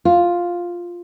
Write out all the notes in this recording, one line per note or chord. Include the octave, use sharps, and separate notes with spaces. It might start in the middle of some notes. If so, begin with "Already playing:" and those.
F4